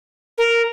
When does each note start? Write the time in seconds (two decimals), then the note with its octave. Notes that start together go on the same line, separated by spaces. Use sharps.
0.38 A#4